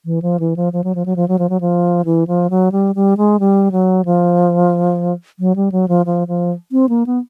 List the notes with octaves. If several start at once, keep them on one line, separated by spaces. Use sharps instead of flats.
E3
F3
E3
F3
F3
F#3
F3
F#3
F3
F#3
F3
F#3
F3
E3
F3
F#3
G3
G3
G#3
G3
F#3
F3
F#3
G3
F#3
F3
F3
F3
C4
A#3
B3